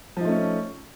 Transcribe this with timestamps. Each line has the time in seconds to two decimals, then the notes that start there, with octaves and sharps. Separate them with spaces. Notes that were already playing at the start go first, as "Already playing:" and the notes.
0.17 F3
0.21 D#4
0.25 A3
0.29 C#4